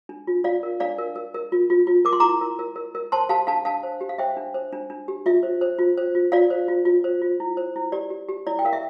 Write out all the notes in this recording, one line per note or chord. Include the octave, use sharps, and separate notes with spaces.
D4
F4
F4 D5 F5
A#4
D4 D5 F5
A#4
A#4
A#4
F4
F4
F4
A#4 D6
C6
E4 A#5 D6
A#4
A#4
A#4
A#4
C5 A5 C6
G4 F5 A5
D4 F5 A5
D4 F5 A5
C5
G4
F5
C5 E5 G5
D4
C5
D4
D4
G4
F4 E5
C5
C5
F4
C5
F4
F4 D5 F5
C5
F4
F4
C5
F4
E4
C5
E4
G4 D5
G4
G4
E4 D5
G5
A#4 F5
E5